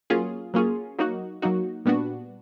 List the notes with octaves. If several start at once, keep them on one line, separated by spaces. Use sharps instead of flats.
F#3 A#3 C#4 F4 G#4
F#3 A#3 C#4 F4 G#4
F#3 A#3 D#4 F#4
F#3 A#3 D#4 F#4
A#2 G3 B3 D4 F#4